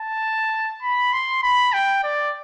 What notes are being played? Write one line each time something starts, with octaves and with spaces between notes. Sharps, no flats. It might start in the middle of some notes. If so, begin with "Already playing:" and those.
Already playing: A5
B5
C6
B5
G5
D5